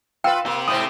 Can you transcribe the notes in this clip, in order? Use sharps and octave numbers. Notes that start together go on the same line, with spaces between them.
F4 B4 F5 G5 E6
A#3 G4 C5
G#2 A3 C4 D#6